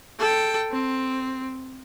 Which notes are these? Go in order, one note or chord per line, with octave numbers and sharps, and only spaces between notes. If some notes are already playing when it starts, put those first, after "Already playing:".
A4 G5
C4